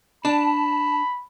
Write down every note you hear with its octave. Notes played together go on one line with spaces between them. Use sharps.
D4 A5 B5